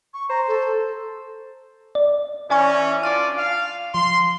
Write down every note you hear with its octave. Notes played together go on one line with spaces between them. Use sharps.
C#6
C5 A#5
A4
D5
E3 C#4 D5 G#5 C#6
D4 F4 D5 F6 D#7
F5
F3 C6